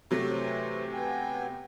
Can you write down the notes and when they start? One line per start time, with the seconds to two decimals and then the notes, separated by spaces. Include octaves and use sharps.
0.11 C3 F#3 A3
0.29 E3 C5 C#5
0.93 B3 G5 G#5